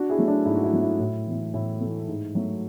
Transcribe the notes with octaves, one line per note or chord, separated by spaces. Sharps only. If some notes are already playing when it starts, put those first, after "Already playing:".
Already playing: D4 F#4
E4 G#4
F#3 A3
D4 F#4
G#2 E4
F#4
E4
F#3 A3
E4
A2
E3 A3
A2 E4
E3 A3
G#2
F#3 A3